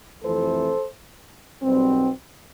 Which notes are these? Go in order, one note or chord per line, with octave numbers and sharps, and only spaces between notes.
F2 C3 E3 A3 C4 A4 C5
B1 B2 G3 C4